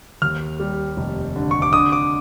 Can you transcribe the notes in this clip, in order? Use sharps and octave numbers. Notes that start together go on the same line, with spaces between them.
D#2 F6
G3
F1
D3
C#6
D6
D3 D#6
D6